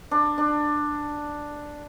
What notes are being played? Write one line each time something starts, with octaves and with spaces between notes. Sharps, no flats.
D4
D4